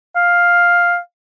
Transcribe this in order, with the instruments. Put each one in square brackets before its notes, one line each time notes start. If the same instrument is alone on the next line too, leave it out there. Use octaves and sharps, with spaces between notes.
[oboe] F5